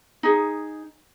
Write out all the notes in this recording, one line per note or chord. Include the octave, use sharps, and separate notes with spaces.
D#4 G#4